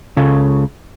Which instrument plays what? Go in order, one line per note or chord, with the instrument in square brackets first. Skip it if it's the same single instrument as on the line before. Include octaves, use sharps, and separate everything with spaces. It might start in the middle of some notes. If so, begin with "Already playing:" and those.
[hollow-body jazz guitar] C#2 C#3 F4 A4 C#5